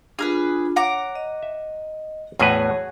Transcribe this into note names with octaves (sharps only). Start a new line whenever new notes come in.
D4 F4 G#4 A#4 B4
C#5 F#5 A#5 D6
D#5
E5
E2 A2 F#4 G#4 B4 C#5